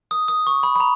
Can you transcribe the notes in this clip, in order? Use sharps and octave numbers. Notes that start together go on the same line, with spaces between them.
D#6
D#6
C#6
B5
B5
A#5